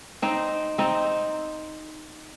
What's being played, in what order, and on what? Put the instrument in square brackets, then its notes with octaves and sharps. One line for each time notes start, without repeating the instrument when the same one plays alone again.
[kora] C4 D#4
C4 D#4